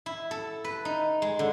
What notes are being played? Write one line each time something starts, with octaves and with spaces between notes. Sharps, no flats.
E4
A4
B4
D#4
G#3
D3